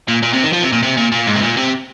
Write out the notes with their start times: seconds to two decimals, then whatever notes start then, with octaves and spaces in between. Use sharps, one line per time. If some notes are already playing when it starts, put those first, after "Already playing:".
0.08 A#2
0.23 A#2
0.33 C3
0.43 D#3
0.52 F3
0.62 C3
0.72 A#2
0.83 C3
0.97 A#2
1.12 A#2
1.27 G#2
1.36 C3
1.42 A#2
1.57 C3